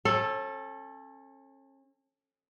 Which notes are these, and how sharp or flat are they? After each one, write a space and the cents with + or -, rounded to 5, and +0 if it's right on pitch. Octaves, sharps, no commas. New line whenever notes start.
C#4 -35 A4 +0